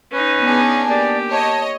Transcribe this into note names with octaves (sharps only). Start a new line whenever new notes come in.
C#4 D#4 B4
B3 D4 G#4
A#3 G4 D5
C#5 D#5 A5